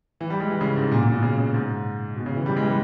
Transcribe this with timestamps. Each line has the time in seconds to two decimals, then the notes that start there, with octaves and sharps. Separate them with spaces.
0.21 E3
0.30 G3
0.40 G#3
0.50 E3
0.61 C#3
0.76 G#2
0.92 A#2
1.03 A#2
1.12 B2
1.22 C#3
1.38 C#3
1.54 G#2
2.16 B2
2.26 C#3
2.36 E3
2.46 G3
2.56 G#3
2.62 E3
2.68 G3